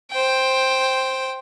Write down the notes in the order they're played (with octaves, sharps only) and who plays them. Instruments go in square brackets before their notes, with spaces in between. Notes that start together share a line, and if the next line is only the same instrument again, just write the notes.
[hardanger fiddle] C5 G5